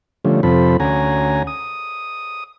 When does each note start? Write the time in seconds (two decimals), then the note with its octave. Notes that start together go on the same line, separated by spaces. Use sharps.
0.25 D3 F3 G3 A3 C#4
0.43 F2 C3 F3 C4 A4 B5
0.80 D2 C#4 F#4 G#5 A#5
1.47 D#6